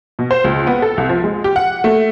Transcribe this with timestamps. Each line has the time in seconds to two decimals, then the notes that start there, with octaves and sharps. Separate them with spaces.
0.19 B2
0.31 C5
0.44 C#2
0.67 B3
0.82 A4
0.97 C2
1.09 F3
1.24 G#3
1.44 G4
1.56 F#5
1.84 A3